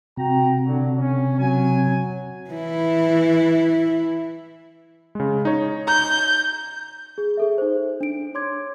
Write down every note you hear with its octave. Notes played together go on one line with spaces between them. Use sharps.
C3 F#4 G5 A#5
D3 F#3
C#4
F#3 G#5
E3 E4
C#3 G#3
D#4 C#5
A#5 G6
G#4
G#4 A4 E5
D#4 C5
D4 D7
C#5 C6 D6 G#6